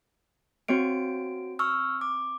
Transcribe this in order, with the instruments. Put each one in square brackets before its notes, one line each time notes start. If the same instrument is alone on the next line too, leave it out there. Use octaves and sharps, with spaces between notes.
[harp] C4 C#5 F5 [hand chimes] F#4 D7
[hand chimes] C#6 E6 F6
D6